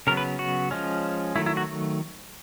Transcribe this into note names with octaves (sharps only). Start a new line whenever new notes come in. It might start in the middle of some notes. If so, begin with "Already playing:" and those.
C#3 F#3 B3 A#4
B4
F#4
F3 G#3 C#4
D#3 F#3 A3 E4
E4
F#4